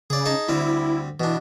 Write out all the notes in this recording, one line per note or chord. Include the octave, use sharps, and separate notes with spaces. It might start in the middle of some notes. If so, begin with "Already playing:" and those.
C#3 G#4 D5
D#4 G#4 A5
D2 G3 C4 E4
B2 E3 D4